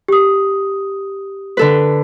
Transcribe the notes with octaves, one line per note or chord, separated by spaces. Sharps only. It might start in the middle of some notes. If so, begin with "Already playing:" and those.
G4 D#6
D3 A4 B4